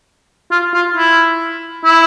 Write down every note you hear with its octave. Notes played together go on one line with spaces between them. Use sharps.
F4
F4
E4
E4